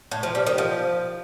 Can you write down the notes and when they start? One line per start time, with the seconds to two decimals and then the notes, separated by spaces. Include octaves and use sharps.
0.11 A2
0.23 F3
0.35 G3
0.46 D#3
0.58 F3